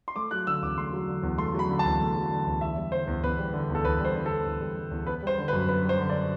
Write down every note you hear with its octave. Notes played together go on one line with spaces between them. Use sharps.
C6
A3 D6
F#3 F#6
D3 E6
E2 D6
A3 C6
F#3
D3
E2
A3 C6
F#3 B5
D3
A5
E2
A3
F#3
D3
E2
E2 E5
G3
D3 C5
E2
E2 B4
G3
D3
E2
A4
E2 B4
G3 C5
D3
E2 A4
E2
G3
D3
E2
B3 B4
G3 C5
D3
B4
F#2
B3 B4
G3 C5
D3
D5